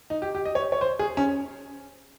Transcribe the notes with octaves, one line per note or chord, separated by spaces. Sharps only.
D#4
G4
G4
D#5
C#5
C#5
C5
G#4
C#4